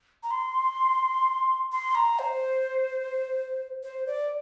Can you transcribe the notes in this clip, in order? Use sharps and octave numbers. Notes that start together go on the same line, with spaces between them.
A#5
C6
C6
A#5
C5
C5
D5